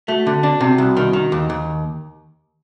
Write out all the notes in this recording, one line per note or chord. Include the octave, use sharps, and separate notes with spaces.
A3 F#4
D3
D4
C3 F#4
C2
D#3
D#3
D#2
D#2